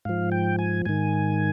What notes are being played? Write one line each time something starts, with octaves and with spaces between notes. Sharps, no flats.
G#2 F3 F5
G5
G#5
G#2 D#3 G#5